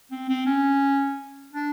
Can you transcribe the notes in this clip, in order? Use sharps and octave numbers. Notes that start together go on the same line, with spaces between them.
C4
C4
C#4
D4